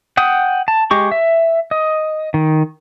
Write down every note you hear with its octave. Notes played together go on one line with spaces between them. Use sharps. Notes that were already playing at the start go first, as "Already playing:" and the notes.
F#5 G5 D#6
A5
G#3 G4 C#6
E5
D#5
D#3